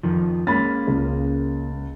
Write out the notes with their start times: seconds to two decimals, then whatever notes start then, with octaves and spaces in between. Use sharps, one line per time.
0.03 F2 D#3 F3
0.47 G#3 A#3 C#4 B5 A6
0.87 C#2